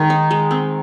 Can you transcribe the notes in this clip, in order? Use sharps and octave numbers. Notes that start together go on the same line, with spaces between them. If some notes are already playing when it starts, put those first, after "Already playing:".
Already playing: D#3 G#3
D#4
G#3
C4